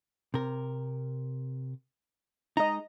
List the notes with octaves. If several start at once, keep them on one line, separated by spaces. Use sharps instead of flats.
C3 A#4
G#3 D#4 D#5 A#5